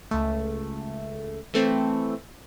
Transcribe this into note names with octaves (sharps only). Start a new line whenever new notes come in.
C#2 A3
E3 A3 C4